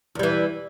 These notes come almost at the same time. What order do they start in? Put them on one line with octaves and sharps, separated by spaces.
E2 G3 E3